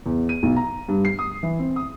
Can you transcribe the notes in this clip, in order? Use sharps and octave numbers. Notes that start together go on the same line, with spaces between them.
E2
D#7
B1
A#5
G2
C7
D#6
E3
C4
D#6